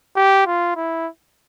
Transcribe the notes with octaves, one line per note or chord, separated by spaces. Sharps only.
G4
F4
E4